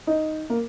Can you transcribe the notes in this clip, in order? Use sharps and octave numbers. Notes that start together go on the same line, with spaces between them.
D#4
A#3